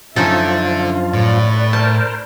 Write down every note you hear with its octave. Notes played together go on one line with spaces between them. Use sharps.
F#2 D3 F3 C#4 D#4 F4 A4 E5
A2 B4 D5
A#4 C5 A5